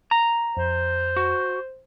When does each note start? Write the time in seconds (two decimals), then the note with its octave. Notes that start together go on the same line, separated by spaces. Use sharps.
0.11 A#5
0.57 F2 C5
1.16 F#4